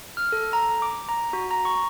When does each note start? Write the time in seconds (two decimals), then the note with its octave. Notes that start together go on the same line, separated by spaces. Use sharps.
0.17 F6
0.32 A4
0.53 A#5
0.82 D6
1.09 A#5
1.33 F#4
1.51 A#5
1.65 C#6